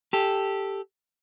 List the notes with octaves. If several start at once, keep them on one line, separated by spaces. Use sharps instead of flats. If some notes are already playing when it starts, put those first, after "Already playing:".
G4 A4